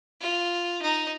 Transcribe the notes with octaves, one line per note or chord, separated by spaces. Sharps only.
F4
D#4